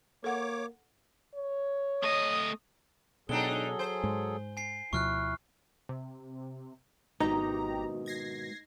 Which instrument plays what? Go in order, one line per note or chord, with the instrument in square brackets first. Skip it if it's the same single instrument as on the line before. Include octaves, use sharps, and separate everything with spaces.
[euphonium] A#3 [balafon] A4 F#5 [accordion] C#5 D6
[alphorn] C#5
[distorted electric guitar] A3 D#5 [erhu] D#6
[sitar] G#2 D4 D#4 [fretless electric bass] B2 [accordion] F#3 G#4 A4 [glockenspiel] G7
[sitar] C5 [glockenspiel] G#5
[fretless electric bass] G#2 G#3
[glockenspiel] G#5 C7
[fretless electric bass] D2 B2 F3 [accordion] E4 [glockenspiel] C#6 F6 F#6
[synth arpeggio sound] C3
[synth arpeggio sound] G#1 G4 A#5 [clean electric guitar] G#2 B2 D#3 [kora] D#4
[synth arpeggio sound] G#6 A#6 C7